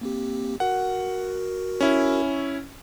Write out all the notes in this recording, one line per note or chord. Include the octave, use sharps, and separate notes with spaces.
A#3 C4 G4
F#4 A#4 F#5
C#4 E4